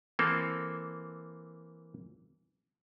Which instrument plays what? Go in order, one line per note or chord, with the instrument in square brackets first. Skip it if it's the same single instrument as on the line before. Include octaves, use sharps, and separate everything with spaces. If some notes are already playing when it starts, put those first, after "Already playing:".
[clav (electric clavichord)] E3 A#3 C4 A4